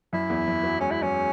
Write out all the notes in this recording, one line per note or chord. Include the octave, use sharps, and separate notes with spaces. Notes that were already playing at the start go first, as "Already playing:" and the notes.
F#2 E4
E2
F#2
F#3
G#3 C#4
E4
F#3 C#4